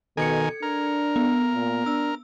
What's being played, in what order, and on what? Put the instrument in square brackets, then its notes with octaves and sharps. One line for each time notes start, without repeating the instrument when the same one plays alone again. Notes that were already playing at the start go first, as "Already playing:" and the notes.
[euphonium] B2 [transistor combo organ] D#3 G#5 [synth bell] A4 G#6 C#7
[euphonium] D4 [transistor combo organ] A#4
[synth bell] B3
[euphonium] A#2
[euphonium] D4 [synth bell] E6